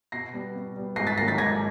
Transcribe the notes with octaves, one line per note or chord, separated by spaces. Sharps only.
B2 A#6 C7
G3 B3
B2
G3 B3
G#2 A#6 C7
A6 B6
D#3 F#3 A#3 A#6 C7
A6 B6
G#2 G#6 A#6